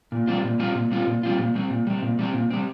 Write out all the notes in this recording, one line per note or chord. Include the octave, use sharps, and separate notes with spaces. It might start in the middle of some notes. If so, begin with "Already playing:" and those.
A#2
G3 C4 F4
A#2
G3 C4 F4
A#2
G3 C4 F4
A#2
G3 C4 F4
A#2
G3 C4
A#2
G3 C4
A#2
G3 C4
A#2
G3 C4